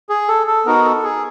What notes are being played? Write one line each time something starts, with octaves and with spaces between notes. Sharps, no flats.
G#4
A4
A4
B3 D#4 F#4 A#4
A4
G#4